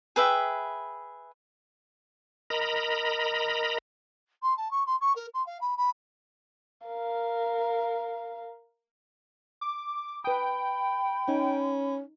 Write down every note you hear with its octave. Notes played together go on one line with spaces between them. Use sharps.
G#4 B4 E5 G5
A#4 D#5 A#5 B5
C6
A5
C#6
C6
C#6
A#4
C6
F5
B5
B5
A#4 F5
D6
B4 G5 B5 D#6
C#4 D#4